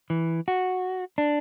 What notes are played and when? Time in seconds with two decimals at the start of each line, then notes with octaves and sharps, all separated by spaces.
0.10 E3
0.48 F#4
1.18 D4